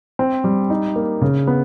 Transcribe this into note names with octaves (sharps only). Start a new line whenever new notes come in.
C4
G3
D#4
A#3
C#3
B3